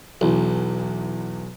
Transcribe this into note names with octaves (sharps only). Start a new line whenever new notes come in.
B1 E2 E3